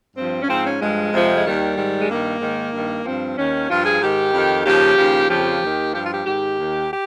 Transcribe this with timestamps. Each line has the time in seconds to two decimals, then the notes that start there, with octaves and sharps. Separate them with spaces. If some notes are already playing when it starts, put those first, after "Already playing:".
0.16 G2 F3 C4
0.42 C#4
0.48 G#2 F3 C4
0.64 C#4
0.80 G2 F3 G#3
1.12 F2 C3 F3
1.35 G#3
1.45 D#2 D#3 G3
1.77 G#2 D#3
2.00 G#3
2.08 G2 A#3
2.14 D#3
2.40 G#2 D#3
2.73 G2 D#3
3.05 G2 F3 C4
3.37 D#2 D#3 C#4
3.69 G2 F3 F4
3.85 G#4
4.01 G#2 D#3 G4
4.33 F2 D#3
4.65 D#2 C#3 F3 G4
4.97 D#2 C#3 F3
5.30 F2 C#3 F3 G4
5.61 D#2 D#3
5.93 G2 F3 G4
6.03 F4
6.11 G4
6.25 G#2 D#3 G4
6.59 D#2 D#3
6.91 G4